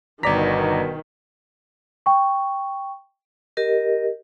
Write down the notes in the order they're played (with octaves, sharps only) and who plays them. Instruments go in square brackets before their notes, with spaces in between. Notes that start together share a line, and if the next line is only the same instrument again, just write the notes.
[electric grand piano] G1 B6 [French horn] B2 [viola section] D#3 [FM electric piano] D5 A#5
[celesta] G5 C#6
[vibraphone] G4 A#4 D#5